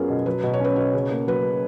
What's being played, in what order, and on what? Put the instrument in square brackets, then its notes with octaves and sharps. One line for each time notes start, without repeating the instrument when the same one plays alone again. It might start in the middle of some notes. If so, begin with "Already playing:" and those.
Already playing: [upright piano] F#2 F#3 C#4 F4 [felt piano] B3 G#4 A#4
[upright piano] B2
[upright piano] F#3 [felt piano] B4
[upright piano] B2
[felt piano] C#5
[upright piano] C#4 [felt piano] B4
[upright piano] B2 [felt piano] C#5
[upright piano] C#3
A#3
[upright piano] F#3 [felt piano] B4